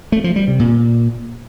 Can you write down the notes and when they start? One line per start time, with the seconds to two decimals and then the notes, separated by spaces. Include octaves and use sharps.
0.12 A3
0.24 F3
0.36 G3
0.48 C3
0.60 A#2